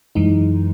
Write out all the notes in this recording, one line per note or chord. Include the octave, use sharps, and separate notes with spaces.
F#2 E3 G#3 D#4